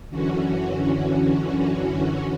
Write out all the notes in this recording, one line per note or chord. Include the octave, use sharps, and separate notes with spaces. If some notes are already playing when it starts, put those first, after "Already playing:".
F#2 D3 E3 C#4 F#4